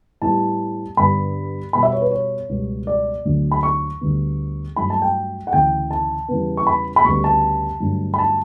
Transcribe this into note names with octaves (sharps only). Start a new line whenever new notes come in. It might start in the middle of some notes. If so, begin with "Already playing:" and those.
A2 G3 B3 A5
G2 D3 G3 B3 B5
B2 G3 B3 B5
E5
C#5
B4
C#5
C#2 B2 G3 B3
D5
D2 D3 F#3 A3
B5
C#6
D2 D3 G3 B3
G2 F#3 A3 B5
A5
G5
F#5
D2 C#3 E3 G5
A5
E2 C#3 G3 B3
C#6
B5
B5
D2 C#3 G3 B3 C#6
A5
G2 D3 F#3 A3
B5
A5